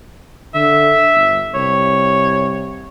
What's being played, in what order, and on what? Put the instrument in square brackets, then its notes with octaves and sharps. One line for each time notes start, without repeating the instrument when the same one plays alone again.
[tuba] D3 [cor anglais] E5
[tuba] G1
[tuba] C2 [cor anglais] C#5